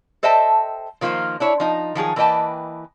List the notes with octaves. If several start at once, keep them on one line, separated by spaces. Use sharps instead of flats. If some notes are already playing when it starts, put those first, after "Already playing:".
A4 C5 D#5 E5 G5 A5
D#3 F3 A#3 F4 C5
D4 E4 C#5
F3 D#4
D#3 F3 F#3 G#4
E3 A#3 B4 D#5 G5 A5